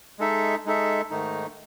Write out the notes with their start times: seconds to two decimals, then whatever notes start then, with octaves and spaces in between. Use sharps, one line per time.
0.19 G#3 D#4 A4 E5
0.65 G#3 D#4 A4 E5
1.10 G#2 D#3 A3 D#4